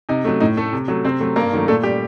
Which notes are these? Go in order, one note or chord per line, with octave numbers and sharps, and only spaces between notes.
C3 D#4
F#3 A3
A2 D#4
A3 A4
C3
F#3 A3
C3 C4 C5
F#3 A3
G2 A#3 A#4
D#3 F#3 A3
A#2 A3 A4
G3 G4